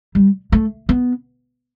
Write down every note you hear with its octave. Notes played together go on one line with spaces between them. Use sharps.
G3
A3
B3